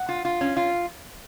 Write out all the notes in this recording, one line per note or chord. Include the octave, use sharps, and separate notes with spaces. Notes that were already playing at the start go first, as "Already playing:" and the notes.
Already playing: F#5
F4
F4
C#4
F4